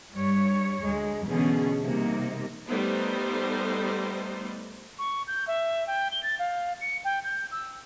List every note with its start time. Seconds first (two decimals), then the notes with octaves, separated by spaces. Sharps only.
0.14 G2 G3 C#5
0.86 D2 G#3
1.26 B2 D3 E3 C#4 G#4
1.81 C3 G3 A#3 D#4
2.68 G3 A3 B3 D#4 C5
4.99 C#6
5.27 G6
5.47 E5
5.87 G5
6.11 G7
6.23 A6
6.39 F5
6.81 C#7
7.04 G5
7.24 G6
7.52 E6